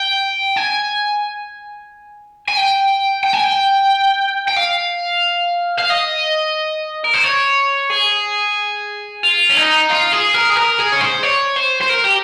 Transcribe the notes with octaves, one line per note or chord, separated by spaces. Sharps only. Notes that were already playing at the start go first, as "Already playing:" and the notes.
Already playing: G5
G#5
G#5
G5
G5
G#5
G5
G5
F5
F5
D#5
A#4
C5
C#5
G#4
F4
C#4
D#4
F4
G#4
A#4
G#4
A#4
G#4
C#5
C5
C#5
C5
C5
A#4
G4